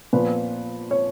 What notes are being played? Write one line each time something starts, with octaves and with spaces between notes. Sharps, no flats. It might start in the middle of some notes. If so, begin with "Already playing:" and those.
A#2 F3 B3 B4
C#5